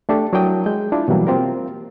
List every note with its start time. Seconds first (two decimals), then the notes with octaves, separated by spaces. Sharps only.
0.09 A3 D4 G4 A4
0.33 F#3 D4 E4 A#4 G5 D#6
0.66 G#3 G6
0.92 D4 E4 F4
1.08 B2 E3 F#3 G3 A#3
1.27 A#3 C4 F4 G4 A#4